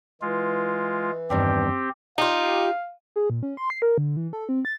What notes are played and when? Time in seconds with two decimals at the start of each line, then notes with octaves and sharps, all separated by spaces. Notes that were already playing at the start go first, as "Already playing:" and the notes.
0.22 E3 G#3 F4
1.30 E2 G2 D#3 C4 G4
2.18 D#4 F4 G4 F5
3.16 G#4
3.30 A#2
3.43 C#4
3.57 C6
3.70 C7
3.82 A#4
3.98 D3
4.17 E3
4.33 A4
4.49 C4
4.65 A6